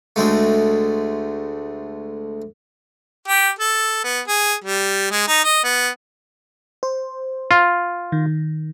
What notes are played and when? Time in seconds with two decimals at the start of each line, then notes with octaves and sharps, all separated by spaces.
0.16 D2 G#3 A3
3.28 G4
3.59 A4
4.04 B3
4.28 G#4
4.64 G3
5.11 G#3
5.28 D#4
5.44 D#5
5.64 B3
6.83 C5
7.51 F4
8.12 D#3